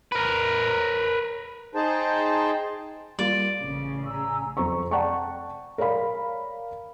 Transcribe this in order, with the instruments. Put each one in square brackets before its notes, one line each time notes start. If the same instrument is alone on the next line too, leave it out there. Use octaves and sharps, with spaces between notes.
[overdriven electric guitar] A#4 B4
[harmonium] D#4 G#4 C5 G5 A5
[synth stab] G3 A#3 F4 [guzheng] D5
[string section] A1 C#3
[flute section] G#5 A#5 E6
[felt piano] F2 C5 A#5 C#6
D5 F#5 G5 A5 A#5 C#6
A#4 C#5 D5 F5 B5